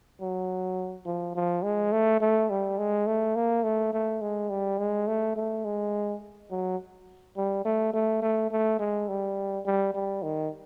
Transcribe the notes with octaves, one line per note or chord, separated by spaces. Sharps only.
F#3
F3
F3
G#3
A3
A3
G3
G#3
A3
A#3
A3
A3
G#3
G3
G#3
A3
A3
G#3
F#3
G3
A3
A3
A3
A3
G#3
G3
G3
G3
D#3